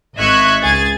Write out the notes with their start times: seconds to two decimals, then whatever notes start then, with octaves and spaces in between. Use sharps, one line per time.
0.16 G#1 D#5 E5 C#6 F#6 G#6
0.62 C#2 G#4 G#6 A6